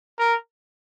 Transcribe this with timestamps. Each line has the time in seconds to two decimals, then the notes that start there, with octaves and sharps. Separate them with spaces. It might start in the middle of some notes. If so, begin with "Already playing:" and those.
0.19 A#4